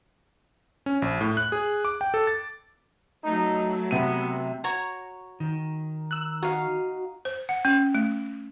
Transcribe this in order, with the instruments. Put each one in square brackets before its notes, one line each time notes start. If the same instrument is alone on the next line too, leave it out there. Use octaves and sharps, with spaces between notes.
[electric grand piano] C#4
A#1
A2
F#6
G#4
D6
G5
A4
A6
[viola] F#3 A3 [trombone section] D#4
[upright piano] C3 D#7 [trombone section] B3
[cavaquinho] F#4 C#5 A#5
[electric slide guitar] D#3
[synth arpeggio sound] E6 F#6
[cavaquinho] D#4 F5 [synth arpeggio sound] F#4
[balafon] C5
F#5
C#4
A3